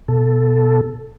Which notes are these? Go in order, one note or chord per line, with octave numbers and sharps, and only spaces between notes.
B2 A4